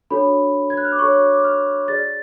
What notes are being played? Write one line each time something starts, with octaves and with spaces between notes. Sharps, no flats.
D4 F#4 A4 C#5 B5
G#6
F#6
F6
D6
D4 F#4 A4 C#5 C#6
D6
F6
G#4 D5 A6